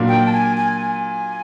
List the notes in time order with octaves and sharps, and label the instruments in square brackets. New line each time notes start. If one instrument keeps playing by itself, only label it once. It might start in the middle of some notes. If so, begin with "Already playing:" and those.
Already playing: [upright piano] A#2 F#3 A#3 D4
[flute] G5
A5
G#5
G#5
G#5